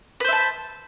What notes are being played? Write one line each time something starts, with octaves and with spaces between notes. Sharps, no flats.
B4 C5 E5 A5